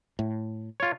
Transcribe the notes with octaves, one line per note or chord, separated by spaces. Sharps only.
A2
F4 C#5